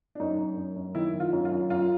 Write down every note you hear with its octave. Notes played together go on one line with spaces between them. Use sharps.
D4
F#2 D#4
F#2
F#2
F#2
D#3 E4
D#3
F4
F#2
F4
F#2
F#2 F4